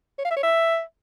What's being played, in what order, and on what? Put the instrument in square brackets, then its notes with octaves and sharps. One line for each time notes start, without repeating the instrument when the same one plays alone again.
[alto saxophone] C#5
F5
E5
C#5
E5